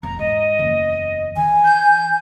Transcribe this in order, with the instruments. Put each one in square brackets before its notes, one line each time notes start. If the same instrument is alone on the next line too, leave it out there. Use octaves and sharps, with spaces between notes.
[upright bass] E1 [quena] A#5
[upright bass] G#2 [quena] D#5
[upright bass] F#1 E2
[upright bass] E3 [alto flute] G#5
[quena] G6